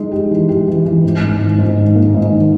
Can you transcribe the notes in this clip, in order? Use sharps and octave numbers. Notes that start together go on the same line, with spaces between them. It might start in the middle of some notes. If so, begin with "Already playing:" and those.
Already playing: G#3 D#4
G4
E3
G4
E3
E3
G#2
G#2
D#3
G#2
D#3
A#3
G#2
D#3